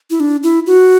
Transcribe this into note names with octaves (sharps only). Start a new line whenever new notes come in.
E4
D4
E4
F#4